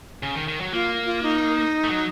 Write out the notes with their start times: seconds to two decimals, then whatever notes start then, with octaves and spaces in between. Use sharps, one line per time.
0.23 C#3
0.35 D#3
0.48 D#3
0.61 F#3
0.73 A#3 F4
1.05 F4
1.23 D#4
1.84 A3
1.89 F#3